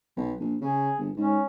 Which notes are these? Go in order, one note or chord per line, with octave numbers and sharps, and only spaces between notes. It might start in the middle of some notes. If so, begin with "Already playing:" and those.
B1
A#1
C#3 G#4
G1
G#2 C#4